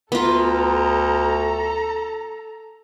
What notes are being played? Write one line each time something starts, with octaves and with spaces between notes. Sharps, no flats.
D2 B3 F4 A4 A#5